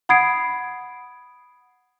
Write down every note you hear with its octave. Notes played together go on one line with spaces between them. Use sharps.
F#5 B5 D#6 G#6 C7 D7